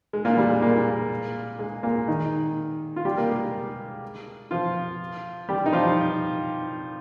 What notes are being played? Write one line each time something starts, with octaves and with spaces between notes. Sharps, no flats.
G#3
A#2 A#3
G3
G#3
A#2 A#3
G#3
A#2 A#3
D#3 D#4
F4
G3 G4
A#3 A#4
G#3 G#4
F3 F4
G3 G4
D#4
F3 F4